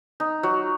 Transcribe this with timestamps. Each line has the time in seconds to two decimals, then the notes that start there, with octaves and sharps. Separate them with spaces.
0.20 D#4
0.43 F#3